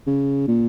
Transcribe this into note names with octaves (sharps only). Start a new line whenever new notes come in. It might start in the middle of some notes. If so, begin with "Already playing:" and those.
C#3
A#2